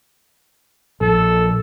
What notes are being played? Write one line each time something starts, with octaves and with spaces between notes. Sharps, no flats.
A#1 A4